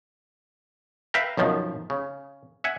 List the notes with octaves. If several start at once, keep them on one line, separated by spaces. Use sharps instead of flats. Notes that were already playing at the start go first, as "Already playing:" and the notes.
B4 E5 F5 G5 A#5
B1 F#2 D#3 F3
C#3
E5 F#5 G#5